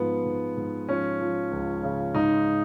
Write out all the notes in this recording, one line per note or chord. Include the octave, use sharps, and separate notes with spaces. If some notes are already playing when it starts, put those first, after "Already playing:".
Already playing: G#2 F3 B3
G#2
G#2
F3 C#4
F3
C#2
C#3
G#2 D#4